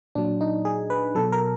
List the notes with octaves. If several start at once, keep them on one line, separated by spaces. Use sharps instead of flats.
A#2 F#3 D4
D#4
G#4
B4
B2 F#3 A4
A#4